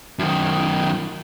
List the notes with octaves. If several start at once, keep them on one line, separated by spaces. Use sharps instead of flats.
F#2 D#3